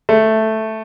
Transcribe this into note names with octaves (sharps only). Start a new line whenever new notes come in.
A3